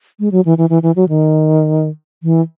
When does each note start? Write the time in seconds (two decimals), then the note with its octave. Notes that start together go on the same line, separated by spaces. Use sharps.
0.20 G#3
0.32 F#3
0.45 E3
0.58 E3
0.70 E3
0.83 E3
0.96 F#3
1.09 D#3
2.23 E3